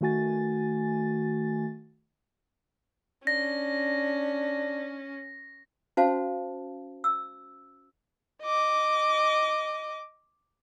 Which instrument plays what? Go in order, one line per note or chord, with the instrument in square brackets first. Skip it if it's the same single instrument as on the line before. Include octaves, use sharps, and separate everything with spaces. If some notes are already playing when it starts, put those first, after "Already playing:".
[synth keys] D#3 A3 F#4 G#5 A6
[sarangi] C#4 [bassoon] D4 [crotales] A#6
[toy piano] C#4 F#4 C5 F5 A5
E6
[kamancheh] D#5 D6